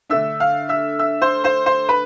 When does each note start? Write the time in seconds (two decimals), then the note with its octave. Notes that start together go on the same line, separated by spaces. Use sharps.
0.10 D3 A3 D4 E5 E6
0.40 F5 F6
0.69 E5 E6
0.99 E5 E6
1.22 C5 C6
1.44 C5 C6
1.66 C5 C6
1.89 B4 B5